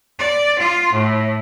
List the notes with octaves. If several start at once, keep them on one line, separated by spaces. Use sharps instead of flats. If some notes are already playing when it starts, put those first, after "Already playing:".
D5
F4
A2